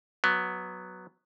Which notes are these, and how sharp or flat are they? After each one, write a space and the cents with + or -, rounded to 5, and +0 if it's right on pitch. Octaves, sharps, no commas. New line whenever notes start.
F#3 +0 B3 +0